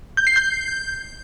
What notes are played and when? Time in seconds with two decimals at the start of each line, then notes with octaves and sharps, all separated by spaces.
0.17 G6
0.27 C7
0.36 G6